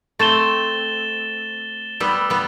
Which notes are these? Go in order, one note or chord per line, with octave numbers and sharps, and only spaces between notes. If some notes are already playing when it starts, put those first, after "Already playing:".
A3 C4 A6 E7 G7
G3 B3 E6 B6 F#7
G3 B3